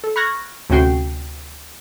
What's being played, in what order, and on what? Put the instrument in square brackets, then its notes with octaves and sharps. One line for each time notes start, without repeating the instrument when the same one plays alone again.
[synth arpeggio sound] A4
B5 C#6 F6 F#6 G#6 A#6
D2 C3 C#4 F#4 G5 C7